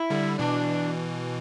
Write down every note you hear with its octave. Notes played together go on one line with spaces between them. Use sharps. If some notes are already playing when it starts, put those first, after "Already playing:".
Already playing: E4
D3 G3
B2 E3 D4